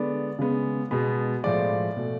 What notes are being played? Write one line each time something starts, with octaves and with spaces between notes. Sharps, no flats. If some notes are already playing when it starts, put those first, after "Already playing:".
Already playing: D3 G#3 B3 D5
C#3 G#3 B3
B2 G#3 B3
A2 F3 G#3 D5
B2 A3